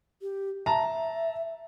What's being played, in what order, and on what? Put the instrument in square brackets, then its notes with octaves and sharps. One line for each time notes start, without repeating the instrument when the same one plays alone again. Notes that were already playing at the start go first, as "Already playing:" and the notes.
[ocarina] G4
[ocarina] E5 [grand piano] A5 A#5